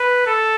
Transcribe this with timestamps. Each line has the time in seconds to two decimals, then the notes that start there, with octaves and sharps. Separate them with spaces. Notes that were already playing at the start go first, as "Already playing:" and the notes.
Already playing: B4
0.27 A4